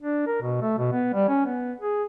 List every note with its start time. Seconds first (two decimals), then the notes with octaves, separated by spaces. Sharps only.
0.02 D4
0.27 A#4
0.42 B2
0.61 A3
0.79 B2
0.92 B3
1.14 G3
1.28 C#4
1.46 B3
1.81 G#4